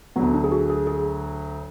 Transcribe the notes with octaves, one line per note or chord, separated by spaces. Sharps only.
D2 D3 F#3 B3
D4
G#4
F#4
G#4
G#4